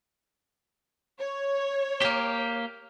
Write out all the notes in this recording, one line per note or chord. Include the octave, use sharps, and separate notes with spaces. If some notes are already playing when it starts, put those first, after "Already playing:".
C#5
A#3 G4